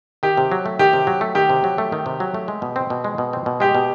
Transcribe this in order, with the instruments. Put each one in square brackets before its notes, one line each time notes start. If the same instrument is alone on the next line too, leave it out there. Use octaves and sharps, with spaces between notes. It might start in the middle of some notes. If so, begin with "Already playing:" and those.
[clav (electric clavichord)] D#3 [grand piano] G4
[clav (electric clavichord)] C3
F#3
A3
[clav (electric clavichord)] D#3 [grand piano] G4
[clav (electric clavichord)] C3
F#3
A3
[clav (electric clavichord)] D#3 [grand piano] G4
[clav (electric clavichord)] C3
F#3
A3
D#3
C3
F#3
A3
G#3
B2
C4
B2
G#3
B2
C4
B2
[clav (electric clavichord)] G#3 [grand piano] G4
[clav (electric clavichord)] B2